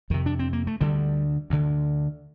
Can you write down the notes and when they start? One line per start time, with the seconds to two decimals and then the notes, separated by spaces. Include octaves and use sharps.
0.10 F2 C3 D#3
0.26 D4
0.39 C4
0.53 A#3
0.67 A3
0.81 D2 D3 G3
1.50 D2 D3